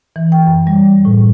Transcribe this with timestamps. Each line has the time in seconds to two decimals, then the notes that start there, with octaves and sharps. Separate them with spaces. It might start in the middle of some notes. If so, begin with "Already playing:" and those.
0.16 E3
0.32 G5
0.47 F#2
0.67 G3
1.05 A2